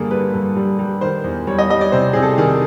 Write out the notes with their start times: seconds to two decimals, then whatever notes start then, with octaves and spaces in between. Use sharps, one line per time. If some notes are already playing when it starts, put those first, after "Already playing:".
Already playing: G2 D3 G3 A#3 G#4 A4
0.11 G3 B4
0.34 G2
0.57 G3
0.79 G3
1.01 D#3 C5
1.24 E2
1.47 G3 C#5
1.59 D#5
1.70 G3 D#5
1.81 D5
1.92 C3 C5
2.13 C3 G#4
2.22 A4
2.38 D#3 G#4